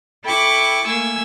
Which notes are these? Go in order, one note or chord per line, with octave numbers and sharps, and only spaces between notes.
E4 A4 G5 B5 C#6 D6
A3 A#3 G#5 E6